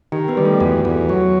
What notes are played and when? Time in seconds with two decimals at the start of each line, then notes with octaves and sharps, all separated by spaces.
0.12 D#3 G4
0.28 B3 B4
0.37 G3
0.45 A3 A4
0.60 E2 F#4
0.85 E2
1.09 F#3